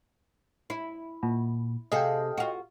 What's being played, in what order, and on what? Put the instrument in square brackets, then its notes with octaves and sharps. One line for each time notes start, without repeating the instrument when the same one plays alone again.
[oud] E4
[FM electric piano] A#2
[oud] C3 G#4 A4 [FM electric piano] D#5 F5 G5
[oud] F4 F#4